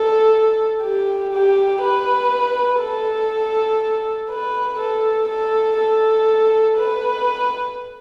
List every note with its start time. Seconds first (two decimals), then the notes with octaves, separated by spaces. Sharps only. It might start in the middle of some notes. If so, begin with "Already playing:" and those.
Already playing: A4
0.82 G4
1.33 G4
1.82 B4
2.80 A4
4.30 B4
4.79 A4
5.28 A4
5.78 A4
6.77 B4